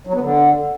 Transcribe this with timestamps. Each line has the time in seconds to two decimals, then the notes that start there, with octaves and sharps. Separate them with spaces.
0.07 F#3
0.14 B3
0.20 D3